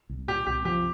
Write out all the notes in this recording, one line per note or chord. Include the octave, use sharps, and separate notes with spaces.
C2
A#2 G4
C2 G4
F3 G4